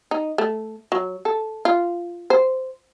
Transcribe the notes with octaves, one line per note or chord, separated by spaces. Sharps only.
D#4
A3
F#3
A4
F4
C5